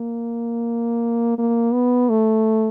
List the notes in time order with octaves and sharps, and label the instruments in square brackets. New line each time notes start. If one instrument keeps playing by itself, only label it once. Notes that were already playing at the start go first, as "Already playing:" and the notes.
Already playing: [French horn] A#3
A#3
B3
A3